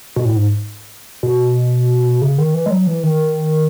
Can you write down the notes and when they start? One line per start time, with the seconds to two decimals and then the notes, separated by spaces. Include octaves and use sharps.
0.16 B2
0.25 A2
0.36 G#2
1.23 B2
2.22 C#3
2.38 D#3
2.54 E3
2.66 G#3
2.71 F#3
2.87 E3
3.03 D#3